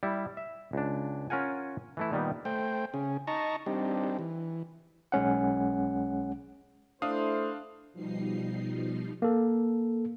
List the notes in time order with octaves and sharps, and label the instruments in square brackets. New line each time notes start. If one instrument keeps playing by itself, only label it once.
[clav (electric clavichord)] G3 E4
E5
C#2 D4
C#4 F4 A#4 F#5 G#5
E3 A3 E4
A#2 D#3 G3 B3
[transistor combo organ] A3 C5 G5
C#3 C#4 G#4
D#4 D#5 A5 A#5 C#6
G3 C4 D4 D#4 G4
E3
[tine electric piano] B1 G#3 C#4 F#5
[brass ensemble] A3 E4 C5 [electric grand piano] D4 F5 D#6
[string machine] B2 F3 G3 D#4 C7
[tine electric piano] A#3 A4